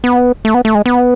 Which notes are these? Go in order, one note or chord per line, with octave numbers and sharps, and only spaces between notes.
B3
A3
B3
A3
G#3
B3